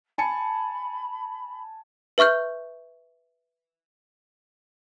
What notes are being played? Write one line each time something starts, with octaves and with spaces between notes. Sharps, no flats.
G#5 A5 B5 C#7
B4 E5 C#6 F6 G6